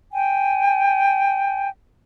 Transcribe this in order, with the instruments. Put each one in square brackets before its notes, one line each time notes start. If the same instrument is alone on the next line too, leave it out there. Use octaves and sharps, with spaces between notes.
[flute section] G5 G#5